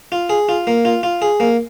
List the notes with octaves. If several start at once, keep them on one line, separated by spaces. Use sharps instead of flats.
F4
G#4
F4
A#3
F4
F4
G#4
A#3